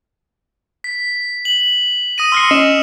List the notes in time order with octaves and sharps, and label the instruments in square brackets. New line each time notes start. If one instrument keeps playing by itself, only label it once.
[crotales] B6
F#7
D#6 A#6 D#7
[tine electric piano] C6 A#6 C7 [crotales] E6 F6 C#7
[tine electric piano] C#4 D#5 [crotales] E7